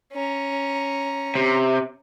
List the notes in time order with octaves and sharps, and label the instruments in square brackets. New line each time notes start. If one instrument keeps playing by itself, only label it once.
[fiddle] C#4 A#5
[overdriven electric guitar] C3